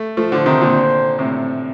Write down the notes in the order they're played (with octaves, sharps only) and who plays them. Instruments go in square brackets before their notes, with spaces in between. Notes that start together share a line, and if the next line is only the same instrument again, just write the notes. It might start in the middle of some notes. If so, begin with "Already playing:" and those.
Already playing: [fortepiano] A3
F3 A3
[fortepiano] D3 F3 [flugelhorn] C5
[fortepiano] C3 D#3
A#2 D3
A2 C3